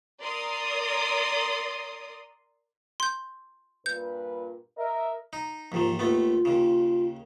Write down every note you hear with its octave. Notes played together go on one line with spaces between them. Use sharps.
A#4 D5 C6 D#6
C6 G6
G2 A#2 B4 G6
A#4 D#5 E5
D#4
D#2 G#2 D#3 F3
D#2 A3 B3 F4
D#2 C#3